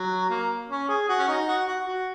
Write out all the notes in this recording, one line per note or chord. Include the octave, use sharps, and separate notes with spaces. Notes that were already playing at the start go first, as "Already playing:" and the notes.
Already playing: F#3
A#3
C#4
G#4
F#4
C#4
D#4
F#4
F#4
F#4